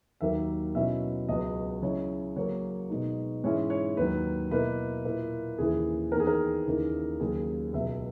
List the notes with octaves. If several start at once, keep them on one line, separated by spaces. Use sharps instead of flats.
D#2 D#3 F#3 A#3 E5
B2 F#3 C#4 E4 E5
C#2 C#3 F#3 B3 D#5
C#3 F#3 C#4 E4 C#5
C#3 F#3 A#3 C#5
B2 G#3 D#4
G#2 E3 G#3 C#4 E4 C#5
C#5
D#2 D#3 F#3 B4
B2 A#3 E4 B4
A#2 A#3 E4
D#2 C#3 E3 G#4
E2 D#3 A#3 A#4
G#4
A#4
D#2 C#3 E3 A#3 D#4
D#2 C#3 F#3 C#4 G#4
C#2 B2 F#3 E5